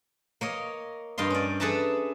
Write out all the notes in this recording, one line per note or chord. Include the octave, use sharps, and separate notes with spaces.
A#3 C#5 D#5
G2 D#5 F5 C6
C#4 D5
G#4 A4 B4 E5 A5 A#5